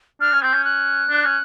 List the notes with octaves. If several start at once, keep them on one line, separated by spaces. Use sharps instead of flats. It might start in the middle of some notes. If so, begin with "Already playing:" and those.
D4 F6
C#4
C4 G6
C#4
F#6
D4
C#4